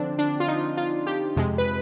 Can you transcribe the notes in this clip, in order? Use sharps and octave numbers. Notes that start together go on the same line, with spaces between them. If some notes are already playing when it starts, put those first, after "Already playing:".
Already playing: D3 F3 C4 D4
D4
F4
D#4
F4
G4
F2 C3 F3 G#3
B4